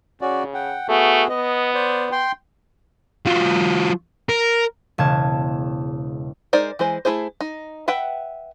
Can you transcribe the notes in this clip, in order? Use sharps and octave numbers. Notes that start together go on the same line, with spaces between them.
C#3 C#4 F#4 D5
F#5 G5
A3 B3 F#4 G#4
B3 D#5
C5 D5
G5 C6
F#3 F4
A#4
E1 C#3 A5 G#6
G#3 D#4 A#4 C5 D5
E3 G#3 C5
A3 A#3 E4 G#4 C5
D#4
B4 E5 F#5 G5